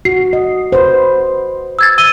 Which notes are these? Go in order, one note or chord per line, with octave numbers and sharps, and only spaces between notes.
F#4 C7
D#5
B4 C5
E6 G#6 A6
E6 D#7 G7